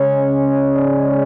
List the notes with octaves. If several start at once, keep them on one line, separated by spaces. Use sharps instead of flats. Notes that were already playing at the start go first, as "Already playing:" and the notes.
Already playing: C#3 G#3 C#4 C#5
D5